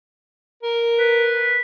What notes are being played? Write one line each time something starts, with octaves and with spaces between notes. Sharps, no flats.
A#4
B4